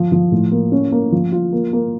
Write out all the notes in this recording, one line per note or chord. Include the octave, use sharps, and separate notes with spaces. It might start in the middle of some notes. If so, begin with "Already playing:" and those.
Already playing: F3
F3
A2
A#3
C#4
A#3
F3
F4
A#3
A#3